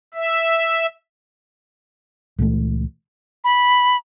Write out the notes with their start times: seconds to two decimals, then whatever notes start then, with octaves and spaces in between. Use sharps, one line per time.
0.14 E5
2.38 C#2 A#2 E3 A3
3.44 B5